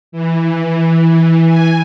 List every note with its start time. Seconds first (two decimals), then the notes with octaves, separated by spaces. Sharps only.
0.12 E3
1.48 G#5